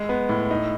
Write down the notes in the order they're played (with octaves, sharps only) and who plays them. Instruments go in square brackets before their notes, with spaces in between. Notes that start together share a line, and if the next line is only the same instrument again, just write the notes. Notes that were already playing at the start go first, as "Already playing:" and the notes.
Already playing: [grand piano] G#3
B3
A2
D#4